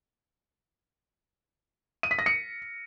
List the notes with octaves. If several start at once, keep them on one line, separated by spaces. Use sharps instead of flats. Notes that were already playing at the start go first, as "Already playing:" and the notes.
D#7
B6
A#6
C#7